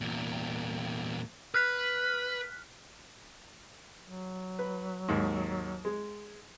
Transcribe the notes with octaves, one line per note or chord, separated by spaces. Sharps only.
E2 A#2
B4 F6 F#6 B6
F#3
B4
D#2 G#2
G#3